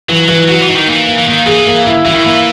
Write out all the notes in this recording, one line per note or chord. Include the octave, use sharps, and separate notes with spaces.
E3 F#3
E3 F#3
F#3 F#4
E3
D#4
D#3
E3 A#3
A#3
E3
D#3 A#3
E3 G#4
A#3
E4
E3 E4
D#3
E3 A#3